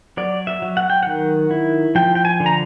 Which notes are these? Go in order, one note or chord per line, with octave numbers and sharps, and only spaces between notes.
F#3 D5
E5
F#3
F#5
G5
D#3 F#5
E4
F3 G5
G5
G#5
D3
A#5